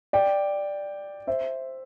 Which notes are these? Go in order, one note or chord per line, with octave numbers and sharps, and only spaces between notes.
D5 G5
C5 E5